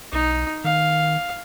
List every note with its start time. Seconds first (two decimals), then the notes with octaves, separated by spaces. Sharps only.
0.13 B1 D#4
0.64 D#3 F5